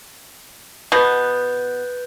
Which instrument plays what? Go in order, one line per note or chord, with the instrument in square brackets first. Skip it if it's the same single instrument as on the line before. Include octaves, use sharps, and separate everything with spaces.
[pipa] B2 B3 [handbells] B4 G6 A6